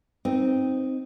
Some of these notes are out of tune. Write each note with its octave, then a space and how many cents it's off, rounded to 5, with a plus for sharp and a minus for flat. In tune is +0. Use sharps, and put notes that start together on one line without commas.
C4 +0 D#4 +0